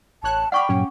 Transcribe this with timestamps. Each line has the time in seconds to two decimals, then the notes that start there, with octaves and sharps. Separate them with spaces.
0.23 A1 C#5 A5 F#6
0.52 D5 F#5 G5 B5 C#6 D6 F6
0.69 G2 A#2 F#3 C#4